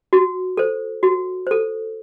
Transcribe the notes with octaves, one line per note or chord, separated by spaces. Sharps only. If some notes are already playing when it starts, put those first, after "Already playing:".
F#4
A4 C5
F#4
A4 C5